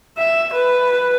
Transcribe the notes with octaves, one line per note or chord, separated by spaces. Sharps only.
E5
B4